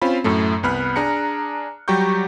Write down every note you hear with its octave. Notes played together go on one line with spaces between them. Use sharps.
C4 C#4 F4 B5
F#2 A2 A3
C2 B3 B5 F6 F#6
D4 G#4 A#5 C#7
F#3 G3 G4 A#5 C#6 G6